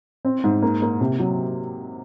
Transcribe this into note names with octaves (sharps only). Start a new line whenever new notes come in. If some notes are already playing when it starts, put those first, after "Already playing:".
C4
G#2
A#3
A#3
C3
F#3